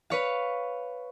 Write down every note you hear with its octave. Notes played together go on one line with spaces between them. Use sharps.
B4 C#5 F5